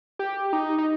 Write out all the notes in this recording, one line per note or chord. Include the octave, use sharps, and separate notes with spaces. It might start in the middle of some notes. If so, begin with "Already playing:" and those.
G4
D#4
D#4